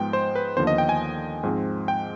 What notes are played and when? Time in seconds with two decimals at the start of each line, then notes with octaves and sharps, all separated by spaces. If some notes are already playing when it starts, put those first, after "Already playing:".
Already playing: G#2 F3 G#3 B3 G5
0.13 C5
0.35 B4
0.56 D#2 D3 F3 B3 C5
0.67 D#5
0.78 G5
0.89 G#5
1.43 G#2 F3 G#3 C4
1.88 G5